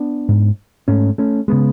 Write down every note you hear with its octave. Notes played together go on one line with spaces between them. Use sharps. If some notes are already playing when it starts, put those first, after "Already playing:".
Already playing: B3 D4
G#2
G#2 A3 C#4
A3 C#4
C#3 G#3 B3